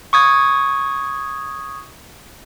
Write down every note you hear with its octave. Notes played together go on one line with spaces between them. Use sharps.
C#6 D#6 G#6